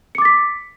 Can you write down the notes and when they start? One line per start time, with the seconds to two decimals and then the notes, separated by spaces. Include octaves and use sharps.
0.15 C#7
0.18 D6
0.22 A6
0.25 B6